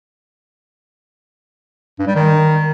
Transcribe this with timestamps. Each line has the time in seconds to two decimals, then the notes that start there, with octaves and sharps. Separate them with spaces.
1.99 G2
2.07 G3
2.15 D#3